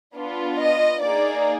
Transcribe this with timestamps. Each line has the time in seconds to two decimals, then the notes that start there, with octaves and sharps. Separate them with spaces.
0.15 B3 D4 F4
0.58 D#5
1.01 A#3 D#4 G#4 D5